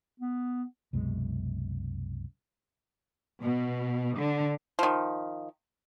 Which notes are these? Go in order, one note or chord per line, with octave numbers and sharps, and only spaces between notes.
B3
C2 F#2 B2 G#3
B2
D3
D#3 F3